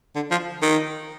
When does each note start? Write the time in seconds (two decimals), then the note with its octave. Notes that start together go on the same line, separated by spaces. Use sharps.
0.15 D3
0.31 F3
0.62 D#3